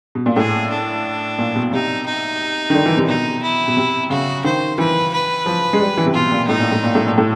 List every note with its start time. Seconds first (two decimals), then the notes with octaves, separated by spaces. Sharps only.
0.15 B2
0.26 A#2
0.36 A2 G#4
0.70 D4
1.38 A#2
1.56 B2
1.73 C3 D#4
2.06 D#4
2.70 D#3
2.74 D3
2.86 E3
2.97 C3
3.08 B2 D#4
3.42 E4
3.68 B2
3.77 C3
4.10 C#3 F#4
4.44 D#3 C5
4.78 E3 B4
5.13 B4
5.46 F3
5.73 G#3
5.80 G3
5.97 E3
6.06 C3
6.14 B2 F4
6.32 A#2
6.48 A2 D#4
6.60 A#2
6.72 A2
6.84 A#2
6.95 A2
7.07 A#2
7.18 A2